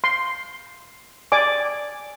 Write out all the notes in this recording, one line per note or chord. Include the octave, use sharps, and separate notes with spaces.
C6
D5 G#5 D6